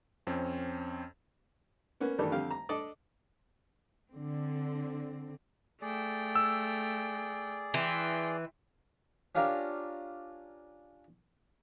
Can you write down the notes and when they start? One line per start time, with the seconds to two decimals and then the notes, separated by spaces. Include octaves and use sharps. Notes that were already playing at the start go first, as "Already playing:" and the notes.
0.27 F2 C4 C#4
2.00 A#3 B3 C#4 B4
2.18 G2 D#3 E3 G3 A3
2.32 F2 D3 G4 F5
2.51 A#5
2.69 D4 A4 D5 D#5
4.12 D3 C4
5.81 A3 G#4 D5 G5
6.36 E6
7.74 E3 G5 C6
9.35 C#4 D4 F4 G4 A#4